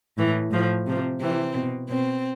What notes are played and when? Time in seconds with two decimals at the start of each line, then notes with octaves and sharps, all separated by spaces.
0.17 A2 E3
0.51 A2 F3
0.86 C3 F3
1.20 C3 E3 C4
1.54 B2
1.89 B2 C4